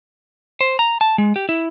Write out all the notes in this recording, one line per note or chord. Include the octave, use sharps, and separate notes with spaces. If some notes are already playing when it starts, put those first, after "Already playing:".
C5
A#5
A5
G#3
G4
E4